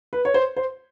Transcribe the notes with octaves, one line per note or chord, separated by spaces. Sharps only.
B4
C#5
C5
C5